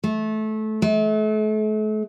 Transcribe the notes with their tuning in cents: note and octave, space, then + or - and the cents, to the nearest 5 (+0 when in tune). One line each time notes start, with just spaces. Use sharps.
A3 -20
A3 -40